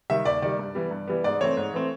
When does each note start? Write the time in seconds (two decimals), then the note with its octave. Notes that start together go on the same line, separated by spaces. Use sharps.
0.10 D#3 G3 E5
0.25 D#2 D5
0.42 D#3 G3 D5
0.59 G2
0.75 E3 G3 B3
0.91 G2
1.08 E3 G3 B3
1.24 G#2 D5
1.41 E3 A3 C4 C#5
1.57 G#2
1.73 E3 A3 C4